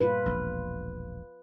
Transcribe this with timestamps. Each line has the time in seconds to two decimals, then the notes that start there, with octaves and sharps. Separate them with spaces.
0.01 G2 A#2 F4 B4
0.26 E1 A#1